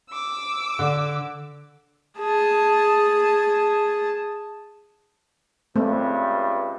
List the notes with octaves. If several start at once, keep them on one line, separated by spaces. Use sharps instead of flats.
D6 E6
D3
G#4 A5
C#2 G2 C3 A3 C4